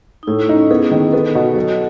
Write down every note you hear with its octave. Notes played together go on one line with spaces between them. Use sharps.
D#4
A2 E4
E4
C#4 D#4
E4
B3 G#4
D#3
B3 A4
B2 C#5
F#3 C#5